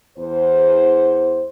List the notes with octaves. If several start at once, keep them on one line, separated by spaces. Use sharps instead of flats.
E2 C5